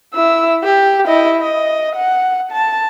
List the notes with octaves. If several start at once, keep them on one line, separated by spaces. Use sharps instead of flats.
E4 E6
G4
E4 D#5
D#5
F#5
A5